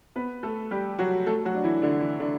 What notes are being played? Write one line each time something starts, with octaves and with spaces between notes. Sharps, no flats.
B3 B4
A3 A4
G3 G4
F#3 F#4
A3 A4
F#3 F#4
D4
E3 E4
D3 D4
E3 E4
D3 D4